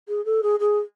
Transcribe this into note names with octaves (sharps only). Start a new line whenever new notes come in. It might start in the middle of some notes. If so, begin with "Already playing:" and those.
G#4
A4
G#4
G#4